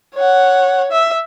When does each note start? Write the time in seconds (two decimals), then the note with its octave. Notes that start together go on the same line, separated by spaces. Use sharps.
0.15 C#5 F#5
0.92 E5